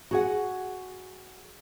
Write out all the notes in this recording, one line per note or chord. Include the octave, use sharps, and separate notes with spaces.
F#4 G#4 F#5